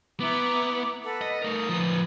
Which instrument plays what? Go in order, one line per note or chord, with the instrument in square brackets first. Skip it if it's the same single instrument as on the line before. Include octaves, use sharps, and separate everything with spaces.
[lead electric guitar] B3 [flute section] E4 A#5 D6
[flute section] A4 B4 F#5
[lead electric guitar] D#5
[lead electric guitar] A3 A#4 [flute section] D#4 D#6
[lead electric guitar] F3 B4